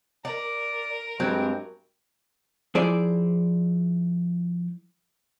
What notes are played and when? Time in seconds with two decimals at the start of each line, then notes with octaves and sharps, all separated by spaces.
0.25 A#4 D5
1.20 G2 F#3 G#3 C4
2.75 F3 E4 G#4 C5 D5